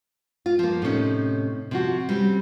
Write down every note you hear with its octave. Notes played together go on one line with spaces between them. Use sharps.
F4
F3 A#3
A2 C3 C#4 D#4
C3 F3 F#4
G3 C4 C#4